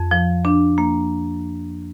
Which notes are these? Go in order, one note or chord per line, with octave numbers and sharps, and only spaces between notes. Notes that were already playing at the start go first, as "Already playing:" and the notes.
Already playing: F2
F3
D4
A#3